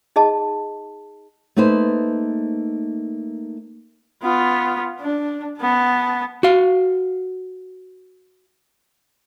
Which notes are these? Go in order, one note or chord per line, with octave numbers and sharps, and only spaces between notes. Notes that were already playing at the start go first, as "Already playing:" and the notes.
D#4 G#4 D#5 A5
A3 A#3 D#4 B4 C5
B3 F4
D4
B3 A5
F#4 F5